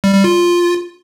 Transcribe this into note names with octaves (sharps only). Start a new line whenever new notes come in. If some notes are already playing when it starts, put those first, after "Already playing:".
G3
G3
F4